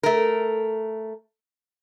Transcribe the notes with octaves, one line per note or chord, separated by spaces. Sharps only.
A3 A#4